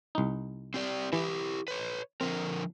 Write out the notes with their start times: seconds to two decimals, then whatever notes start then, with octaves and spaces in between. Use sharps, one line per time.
0.15 C2 D#4
0.74 C4 G4 D5
1.13 E3 E4 G4
1.68 B4 C#5
2.21 D3 F3 C4 A#4